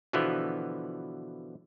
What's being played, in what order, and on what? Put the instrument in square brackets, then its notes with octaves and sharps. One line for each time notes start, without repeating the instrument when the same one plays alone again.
[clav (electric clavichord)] B2 D3 E3 F3 B3